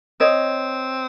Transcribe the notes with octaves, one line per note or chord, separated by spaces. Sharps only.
C4 C#5 D#5